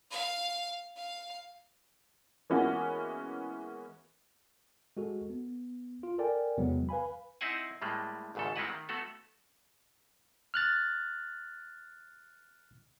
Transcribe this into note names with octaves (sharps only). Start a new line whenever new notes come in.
F5
F5
E3 G#3 A#3 B3 C#4 F#4
G#3 F#4 A4
B3
F4
A4 A#4 D5 G5 G#5
E2 C3 F#3 G#3 B3
B4 F5 G#5 B5
C4 D#4 E4 C5 F#5 G#5
A2 G3 G#3 A#3
G#1 D2 G#2 C#3 A4
G3 G#3 C4 E4 B4 F#5
D#3
A3 B3 F#4 A4
F6 F#6 A6